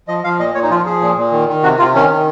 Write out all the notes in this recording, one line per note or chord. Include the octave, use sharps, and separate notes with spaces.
F3 D#5
F3 F5
A#2 D#5
A#2 C#5
D#4
F3 F4
F3 G#4
A#2
A#2
D#3
D#3
C3 F#4
C3 F4
D#3 C#4
D#3